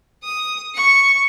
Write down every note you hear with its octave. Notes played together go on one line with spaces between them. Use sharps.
D#6
C#6